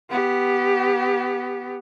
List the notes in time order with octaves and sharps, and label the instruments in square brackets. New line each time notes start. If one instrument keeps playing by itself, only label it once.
[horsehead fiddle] B3 G4